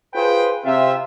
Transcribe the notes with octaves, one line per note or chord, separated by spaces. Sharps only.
F4 G#4 B4 C5 G5
C3 C4 F4 E5